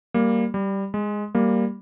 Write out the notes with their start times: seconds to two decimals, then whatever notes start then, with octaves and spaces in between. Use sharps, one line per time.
0.14 G3 A#3
0.54 G3
0.94 G#3
1.35 G3 A#3